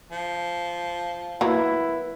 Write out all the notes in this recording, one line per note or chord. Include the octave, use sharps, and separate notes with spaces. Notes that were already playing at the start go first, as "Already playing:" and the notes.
F3
F#3 A#3 B3 E4 B4